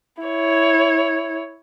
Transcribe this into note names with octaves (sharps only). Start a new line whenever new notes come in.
E4 C#5